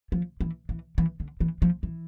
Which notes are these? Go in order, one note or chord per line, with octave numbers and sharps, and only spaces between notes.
F3
E3
E3
E3
D3
E3
F3
E3